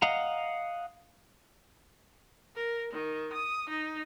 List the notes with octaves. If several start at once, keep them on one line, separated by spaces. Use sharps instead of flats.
D#5 F5 F#5 A#5
A#4
D#3
D#6
D#4